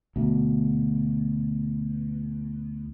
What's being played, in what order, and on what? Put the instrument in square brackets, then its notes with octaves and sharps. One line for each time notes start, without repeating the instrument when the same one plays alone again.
[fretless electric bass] D2 B2